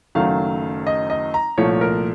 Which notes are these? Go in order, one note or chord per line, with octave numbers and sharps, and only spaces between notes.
F#1 F#2 D#3 F#3 A3 F5
D#5
D#5
A#5
C2 A#2 F3 A3 C#5
A#4